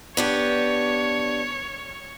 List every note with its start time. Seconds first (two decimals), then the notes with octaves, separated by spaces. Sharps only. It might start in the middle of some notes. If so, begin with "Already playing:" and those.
0.17 B3 D4 G4 C#5